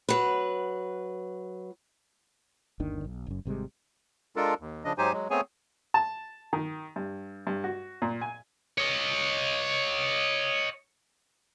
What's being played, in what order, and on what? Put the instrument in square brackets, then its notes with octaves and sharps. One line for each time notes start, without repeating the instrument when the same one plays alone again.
[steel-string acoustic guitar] F#3 B4
[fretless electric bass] G1 D#2 D#3 D4
B1
F#1 F#2
G#1 C3 G3 G#3
[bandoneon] G#3 D4 F4 A4 A#4
D#2
C#3 F3 D4 D#5
G#2 F#3 D#4 G4 C5 G#5
F#3 G#3
A3 B3 C4 G#4 C#5 G#5
[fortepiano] A5
D#3
G2
G2
F#4
A#2
G#5
[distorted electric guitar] C#5 D#5